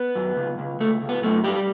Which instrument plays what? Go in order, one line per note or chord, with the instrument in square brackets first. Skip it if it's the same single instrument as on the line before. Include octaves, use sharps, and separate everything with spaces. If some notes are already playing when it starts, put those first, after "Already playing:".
Already playing: [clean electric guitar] B3
F#2
C#2
C#2
C#2 A3
C#2
B3
F#2 A3
G3 G4